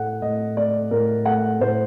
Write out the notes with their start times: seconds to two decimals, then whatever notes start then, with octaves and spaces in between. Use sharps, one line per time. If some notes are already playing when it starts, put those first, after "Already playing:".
Already playing: A2 A3 F#5
0.22 A2 D#5
0.57 A3 D5
0.91 A2 A#4
1.26 A3 F#5
1.60 A2 C5